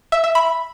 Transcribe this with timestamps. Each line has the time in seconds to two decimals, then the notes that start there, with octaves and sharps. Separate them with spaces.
0.12 E5
0.24 E5
0.35 B5